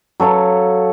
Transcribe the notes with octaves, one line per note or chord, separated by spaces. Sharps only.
F#3 A4 C#5 F5